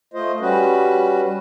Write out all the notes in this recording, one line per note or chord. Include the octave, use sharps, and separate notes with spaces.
A3 F4 C5 D#5
G3 C#4 F#4 B4